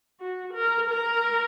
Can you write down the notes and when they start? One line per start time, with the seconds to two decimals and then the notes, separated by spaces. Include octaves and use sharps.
0.20 F#4
0.54 A#4
0.90 A#4